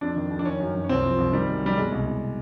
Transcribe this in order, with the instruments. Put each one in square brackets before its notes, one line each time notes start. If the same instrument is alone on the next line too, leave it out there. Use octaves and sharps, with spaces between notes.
[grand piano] F2 D4
D#3
F2
D4
D#3 C#4
F#2
F#2
C#4
C2 C4
F3
C2
D#3 G3
F#2
F#2 G3
B2 G#3
C2
C2